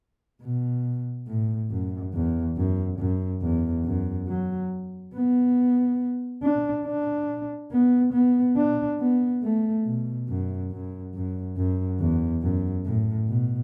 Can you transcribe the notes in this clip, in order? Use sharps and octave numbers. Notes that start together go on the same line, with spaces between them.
B2
A2
F#2
E2
F#2
F#2
E2
F#2
F#3
B3
D4
D4
B3
B3
D4
B3
A3
B2
F#2
F#2
F#2
F#2
E2
F#2
A2
B2